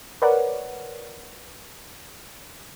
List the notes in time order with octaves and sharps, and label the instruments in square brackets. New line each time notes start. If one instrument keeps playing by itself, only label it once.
[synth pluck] A#4 B4 C#5 D5 F#5